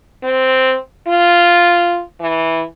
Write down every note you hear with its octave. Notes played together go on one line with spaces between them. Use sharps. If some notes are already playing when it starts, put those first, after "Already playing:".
C4
F4
E3